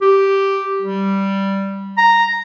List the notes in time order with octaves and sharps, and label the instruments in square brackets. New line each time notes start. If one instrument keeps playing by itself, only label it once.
[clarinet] G4
G3
A#5